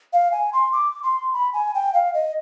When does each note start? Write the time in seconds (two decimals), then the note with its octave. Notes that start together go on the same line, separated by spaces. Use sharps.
0.13 F5
0.32 G#5
0.53 C6
0.73 D6
1.03 C6
1.33 B5
1.53 G#5
1.75 G5
1.94 F5
2.14 D#5